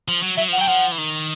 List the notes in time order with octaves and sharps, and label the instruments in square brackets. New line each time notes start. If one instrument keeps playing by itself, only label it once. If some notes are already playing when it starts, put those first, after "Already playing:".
[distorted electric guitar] F3
F#3
[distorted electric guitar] F#3 [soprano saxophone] E5
[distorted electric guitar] F3
[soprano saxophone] F#5
[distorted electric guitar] F#3 [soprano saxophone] G5
[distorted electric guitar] F3 [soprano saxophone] F#5
[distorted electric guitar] E3
D#3